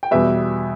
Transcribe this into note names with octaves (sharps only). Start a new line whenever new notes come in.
G5
E2 B2 G3 B4 E5